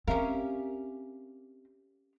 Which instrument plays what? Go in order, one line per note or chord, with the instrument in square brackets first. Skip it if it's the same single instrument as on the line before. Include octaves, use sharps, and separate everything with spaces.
[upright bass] C4 [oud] C#4 A#4 [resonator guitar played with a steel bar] G4 E5 F5